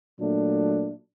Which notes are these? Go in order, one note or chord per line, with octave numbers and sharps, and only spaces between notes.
A#2 F#3 A3 D4